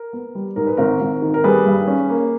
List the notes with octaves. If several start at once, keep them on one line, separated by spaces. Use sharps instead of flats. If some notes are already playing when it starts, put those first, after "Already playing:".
Already playing: A#4
B3
G3
G#2 A#4
B4
G#1 A#4
G#1
D#3
A#4
G3 G#4 B4
G2
C#4
A#3